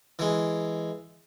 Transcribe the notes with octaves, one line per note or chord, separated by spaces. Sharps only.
E3 G#3